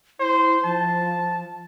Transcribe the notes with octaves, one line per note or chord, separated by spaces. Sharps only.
E4 C5
F3 A5